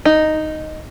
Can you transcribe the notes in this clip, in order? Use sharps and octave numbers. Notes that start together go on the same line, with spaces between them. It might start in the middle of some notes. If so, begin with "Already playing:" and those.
D#4